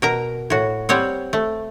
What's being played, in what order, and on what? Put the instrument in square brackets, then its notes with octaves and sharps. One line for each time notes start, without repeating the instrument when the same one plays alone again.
[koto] B2 A#4 A#5
A2 F#4
G3 C4 C#5 F#5
A3